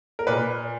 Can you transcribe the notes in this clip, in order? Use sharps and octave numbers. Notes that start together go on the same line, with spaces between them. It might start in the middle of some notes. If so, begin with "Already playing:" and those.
A#4
A#2 B4